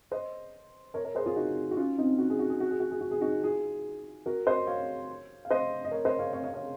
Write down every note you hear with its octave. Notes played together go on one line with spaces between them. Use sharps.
C5 D#5
A#4 C#5
A#4 C#5
G#4 C5
F4 G#4
D#4 F#4
F#4
C#4 F4
C4 D#4
F#4
G#4
F#4
G#4
F#4
G#4
F#4
G#4
F#4
G#4
D#4 F#4
F4 G#4
F#4 A#4
C5 D#5
C#5 F5
F5
C5 D#5
D#5
A#4 C#5
C5 D#5
C#5 F5
C#5 F5
C#5 F5
C#5 F5